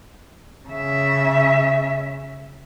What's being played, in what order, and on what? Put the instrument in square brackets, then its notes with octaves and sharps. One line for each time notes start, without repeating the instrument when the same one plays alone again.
[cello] C#3 E5